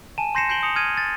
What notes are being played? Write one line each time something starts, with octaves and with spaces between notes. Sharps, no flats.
G#5 A5 D#7 E7
C6 G6 A#6 C7 C#7 E7
G6 C7 D7 F#7 G7
D#6 C#7 F7
D#6 F6 G#6 D#7
A6